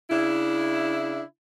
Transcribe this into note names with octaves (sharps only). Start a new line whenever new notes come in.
C#3 D4 E4